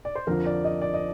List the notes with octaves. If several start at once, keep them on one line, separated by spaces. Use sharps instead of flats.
D5
C5
F2 D3 F3 A#4
D5
D#5
D5
D#5